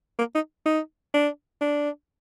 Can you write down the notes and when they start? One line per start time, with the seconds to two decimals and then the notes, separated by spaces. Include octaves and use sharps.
0.18 A#3
0.35 D#4
0.65 D#4
1.14 D4
1.61 D4